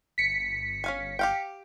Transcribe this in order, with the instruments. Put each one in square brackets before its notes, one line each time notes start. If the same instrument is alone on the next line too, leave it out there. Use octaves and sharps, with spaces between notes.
[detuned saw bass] G1 [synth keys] B6 C#7
[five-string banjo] C#4 F5 G#5
G4 F5 G5